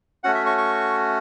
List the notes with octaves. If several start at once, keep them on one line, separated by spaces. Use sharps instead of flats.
A3 C#4 F#4 F#5
E5
C#6
C#6